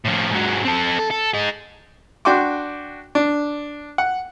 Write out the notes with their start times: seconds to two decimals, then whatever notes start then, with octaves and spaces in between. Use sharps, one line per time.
0.05 A2 F3
0.31 G#2 F#3
0.65 C4 A4
0.99 A4
1.11 A4
1.34 D#4 G#4
2.25 D4 F#4 G5 C6 D6
3.15 D4
3.98 F#5